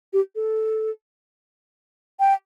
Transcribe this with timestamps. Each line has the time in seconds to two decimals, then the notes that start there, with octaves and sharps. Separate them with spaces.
0.13 G4
0.36 A4
2.20 G5